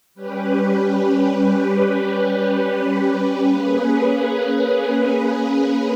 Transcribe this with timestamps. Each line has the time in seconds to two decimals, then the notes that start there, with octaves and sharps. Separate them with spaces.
0.14 G3 C#4 G4 B4
3.46 A#3 C#4 G#4 B4